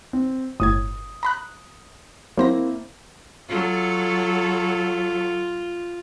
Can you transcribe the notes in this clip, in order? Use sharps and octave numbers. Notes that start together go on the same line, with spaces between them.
C4
G1 A2 D#6 G#6
A#5 B5 F#6
F#3 A#3 C4 E4 C5 A#6
F#3 F4 A4